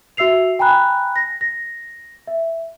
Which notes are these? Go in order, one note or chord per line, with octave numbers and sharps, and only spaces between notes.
F#4 E5 E6 C7 F7
G5 G#5 A#5 B5 F#6
A#6
A#6
E5